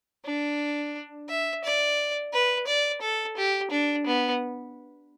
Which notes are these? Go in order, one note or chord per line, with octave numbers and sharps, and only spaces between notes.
D4
E5
D5
B4
D5
A4
G4
D4
B3